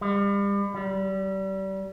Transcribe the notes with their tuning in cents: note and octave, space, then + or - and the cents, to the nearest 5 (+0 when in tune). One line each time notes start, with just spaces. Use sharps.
G3 +35
G3 -30